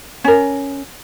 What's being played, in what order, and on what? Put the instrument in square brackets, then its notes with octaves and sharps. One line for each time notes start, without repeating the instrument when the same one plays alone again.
[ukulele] C#4 A#4